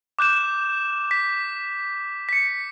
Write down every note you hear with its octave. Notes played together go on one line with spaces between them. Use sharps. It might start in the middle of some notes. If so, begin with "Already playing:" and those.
D6 F#6 G6 E7
B6
B6 C#7